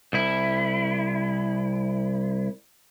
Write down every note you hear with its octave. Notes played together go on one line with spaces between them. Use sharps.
C2 E4